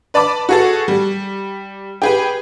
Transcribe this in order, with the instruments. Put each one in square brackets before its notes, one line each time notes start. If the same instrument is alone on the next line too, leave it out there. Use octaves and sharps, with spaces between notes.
[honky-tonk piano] B4 D5 A5 B5 D6
F#4 G#4 A4
G3
G4 G#4 B4